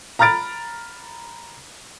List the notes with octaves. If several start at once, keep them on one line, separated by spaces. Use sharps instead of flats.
A#5 B5 F6 A6 D7